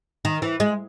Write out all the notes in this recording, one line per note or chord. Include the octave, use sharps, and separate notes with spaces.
D#3
E3
G#3